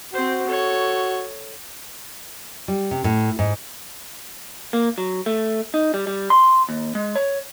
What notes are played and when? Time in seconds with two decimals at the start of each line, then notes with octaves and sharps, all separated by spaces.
0.14 C4 F#4 C5
0.47 A4 C#5
2.68 G3
2.91 C3
3.04 A2
3.39 G#2
4.73 A#3
4.98 F#3
5.26 A3
5.74 D#4
5.94 G3
6.07 G3
6.30 C6
6.69 D#2
6.95 G#3
7.16 C#5